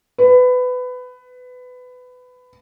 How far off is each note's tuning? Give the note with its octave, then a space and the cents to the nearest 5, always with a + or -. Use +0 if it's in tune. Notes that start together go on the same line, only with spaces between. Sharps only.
B4 +20